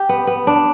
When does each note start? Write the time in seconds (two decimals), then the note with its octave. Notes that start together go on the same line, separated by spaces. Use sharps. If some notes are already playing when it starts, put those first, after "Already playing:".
Already playing: G4
0.09 B3
0.27 B3
0.47 D4